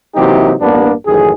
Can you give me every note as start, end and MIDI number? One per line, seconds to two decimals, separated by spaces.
0.15 0.53 48
0.15 0.53 52
0.15 0.53 54
0.15 0.53 58
0.15 0.53 63
0.15 0.53 67
0.60 0.93 33
0.60 0.93 43
0.60 0.93 58
0.60 0.93 59
0.60 0.93 62
1.06 1.32 33
1.06 1.32 42
1.06 1.32 51
1.06 1.32 68